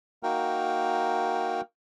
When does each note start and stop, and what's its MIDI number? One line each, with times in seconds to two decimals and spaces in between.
0.23 1.61 58
0.23 1.61 63
0.23 1.61 66
0.23 1.61 70
0.23 1.61 79